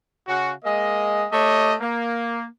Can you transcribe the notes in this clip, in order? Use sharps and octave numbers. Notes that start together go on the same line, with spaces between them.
C#3 F#4
G#3 A#3 D#5
A3 G4 C#5 D#5
A#3